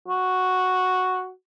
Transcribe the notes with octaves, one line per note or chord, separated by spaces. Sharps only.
F#4